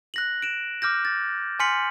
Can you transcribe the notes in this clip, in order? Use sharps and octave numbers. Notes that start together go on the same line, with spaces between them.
F#6 A#6 F#7
D7 E7
D6 F6 G6 A#6
A6
G#5 C6 F6 B6 C#7 F#7